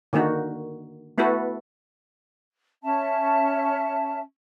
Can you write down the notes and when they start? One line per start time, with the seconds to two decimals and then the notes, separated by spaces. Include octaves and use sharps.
0.13 D3 D#3 A#3 D#4 F#4
1.18 A3 B3 E4 F#4 A4 B4
2.83 C#4 E5 A5